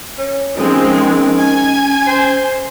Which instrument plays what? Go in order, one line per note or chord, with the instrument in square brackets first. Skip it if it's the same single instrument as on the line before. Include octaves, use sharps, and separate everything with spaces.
[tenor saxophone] C#4
[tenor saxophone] D#3 [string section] F3 G#3 C4 [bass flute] C#4
[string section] G#5 G#6
[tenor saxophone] C5